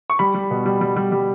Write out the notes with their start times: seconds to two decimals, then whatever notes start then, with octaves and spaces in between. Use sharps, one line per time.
0.10 C#6
0.19 G3 B5
0.35 G3
0.51 B2
0.66 G3
0.81 G3
0.96 G3
1.12 G3